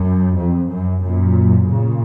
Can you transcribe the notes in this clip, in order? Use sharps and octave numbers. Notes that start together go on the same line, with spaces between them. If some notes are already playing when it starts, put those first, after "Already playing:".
Already playing: F#2
F2
F#2
F#2 A#2
A#2 C#3